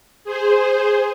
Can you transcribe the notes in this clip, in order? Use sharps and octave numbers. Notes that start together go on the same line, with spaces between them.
G#4 C5